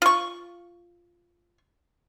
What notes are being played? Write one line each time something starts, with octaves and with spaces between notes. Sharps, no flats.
F4 C#6